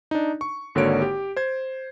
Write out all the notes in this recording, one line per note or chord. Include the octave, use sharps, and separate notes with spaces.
D4 D#4
C#6
G#1 D3 A#3 F#4 C#5 D7
G4
C5 G#6